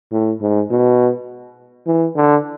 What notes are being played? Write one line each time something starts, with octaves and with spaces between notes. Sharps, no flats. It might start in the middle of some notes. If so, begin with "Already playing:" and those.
A2
G#2
B2
E3
D3